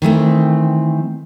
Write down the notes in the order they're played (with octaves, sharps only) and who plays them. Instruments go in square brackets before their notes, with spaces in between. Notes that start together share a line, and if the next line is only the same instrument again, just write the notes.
[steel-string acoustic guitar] D#3 E3 A3 C4